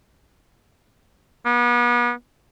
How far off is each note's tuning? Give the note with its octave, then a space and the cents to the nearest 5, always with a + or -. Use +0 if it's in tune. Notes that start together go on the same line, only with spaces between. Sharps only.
B3 -40